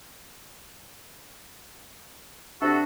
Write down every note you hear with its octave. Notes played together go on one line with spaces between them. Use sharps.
C3 D4 F#4 A4 E5